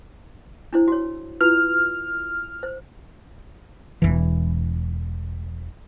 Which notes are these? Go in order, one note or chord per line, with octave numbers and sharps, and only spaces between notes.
D4 E4 C5
F#4 C#5
E4 F4 B4 F6
C5
E1 C2 E3